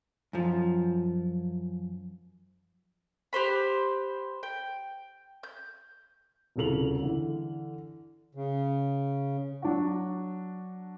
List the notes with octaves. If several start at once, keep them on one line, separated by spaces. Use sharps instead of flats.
F#2 F3
G4 B4 C5 B5
G5
G6
D#1 C2 C#3 A4 F7 F#7
D3 E3
C#3
F#3 D4 F#4